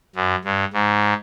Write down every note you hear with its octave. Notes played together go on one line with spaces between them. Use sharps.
F#2
G2
G#2